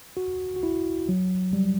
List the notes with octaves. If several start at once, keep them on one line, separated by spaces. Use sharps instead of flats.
F#4
F#4
E4
F#3
G3